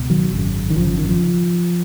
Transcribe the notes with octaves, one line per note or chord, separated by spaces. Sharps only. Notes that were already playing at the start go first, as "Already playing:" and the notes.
Already playing: C#2 B2
D#3 F#3
G#1 F#2 C#3
D#3
G#1 F#2 C#3 F3
F3
D#3
F3